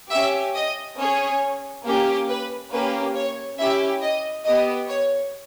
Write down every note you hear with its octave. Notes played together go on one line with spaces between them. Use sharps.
C#4 G4 E5
D#5
C#4 G#4 C#5
A#3 C#4 G4
B4
A#3 C#4 G4 B4
C#5
C#4 E4 G4 E5
D#5
B3 G4 D#5
C#5